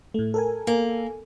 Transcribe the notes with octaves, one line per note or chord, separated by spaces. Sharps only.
A2 A3
A4 A#4 G#5
A#3